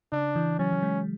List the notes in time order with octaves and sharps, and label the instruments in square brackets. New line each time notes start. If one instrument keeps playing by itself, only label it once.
[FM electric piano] C#3 [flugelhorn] D4
[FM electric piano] E3
[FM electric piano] F#3 [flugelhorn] C#4
[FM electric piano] F#3
G#3